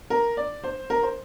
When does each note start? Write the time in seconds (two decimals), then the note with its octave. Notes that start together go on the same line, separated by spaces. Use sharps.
0.10 A#4
0.37 D5
0.64 C5
0.90 A#4
1.03 C5